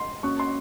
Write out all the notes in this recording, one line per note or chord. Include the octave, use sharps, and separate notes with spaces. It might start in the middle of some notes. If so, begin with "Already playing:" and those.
Already playing: C6
A#3 C#4 F#4 C#6
C6